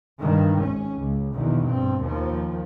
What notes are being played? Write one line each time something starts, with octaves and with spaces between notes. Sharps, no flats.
G2 D#3
G#1 C#4
C#2
A#1 E2 B2 D#3
G2 C4
D#2 F3